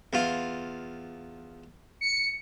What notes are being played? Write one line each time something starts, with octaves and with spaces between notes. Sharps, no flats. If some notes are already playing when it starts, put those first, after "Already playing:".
E2 F4
C#7